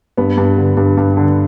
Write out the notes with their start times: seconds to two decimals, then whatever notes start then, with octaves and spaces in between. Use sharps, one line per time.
0.17 G2 B3
0.38 G2
0.58 D3
0.77 G2
0.97 G2
1.17 D3